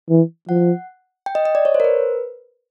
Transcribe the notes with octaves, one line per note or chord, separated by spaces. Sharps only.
E3
F3 F#5
G5
D#5
D#5
D5
C#5
C5
A#4
B4